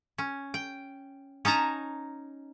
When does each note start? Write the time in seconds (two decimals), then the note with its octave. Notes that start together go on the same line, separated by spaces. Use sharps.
0.18 C#4
0.54 G5
1.45 C#4 D#4 A5 A#5